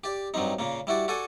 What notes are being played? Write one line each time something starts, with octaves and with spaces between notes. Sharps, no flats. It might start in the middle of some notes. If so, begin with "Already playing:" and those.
G4 D5
G2 F#3 G3 C4 D#4
A#2 C#3 A#3
G3 E4 F#4 D5
F#4 A4 D5 G#5